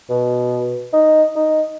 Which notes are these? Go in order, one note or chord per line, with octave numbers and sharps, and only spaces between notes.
B2
D#4
D#4